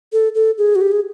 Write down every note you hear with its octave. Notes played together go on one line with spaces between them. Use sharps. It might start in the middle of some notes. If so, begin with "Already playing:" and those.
A4
A4
G#4
F#4
G4
G#4